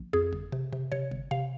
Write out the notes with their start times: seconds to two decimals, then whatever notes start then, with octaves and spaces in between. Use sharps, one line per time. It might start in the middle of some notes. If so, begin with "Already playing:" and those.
Already playing: A#1
0.13 F2 G#4
0.33 G1
0.52 C3
0.73 C3
0.92 C3 C#5
1.11 G1
1.31 C3 F5